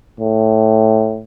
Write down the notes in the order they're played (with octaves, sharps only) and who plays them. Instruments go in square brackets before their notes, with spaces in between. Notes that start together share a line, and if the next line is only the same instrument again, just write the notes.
[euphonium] A2